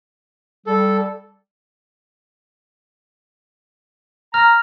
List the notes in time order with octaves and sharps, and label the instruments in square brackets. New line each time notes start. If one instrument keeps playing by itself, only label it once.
[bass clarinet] G3 [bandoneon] A4
[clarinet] A#5 [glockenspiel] F6